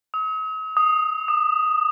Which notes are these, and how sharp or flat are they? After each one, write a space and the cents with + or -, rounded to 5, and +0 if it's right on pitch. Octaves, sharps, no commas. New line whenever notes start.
D#6 +45
D#6 +0
D#6 -35